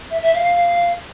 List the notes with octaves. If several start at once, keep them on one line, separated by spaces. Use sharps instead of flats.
E5
E5
F5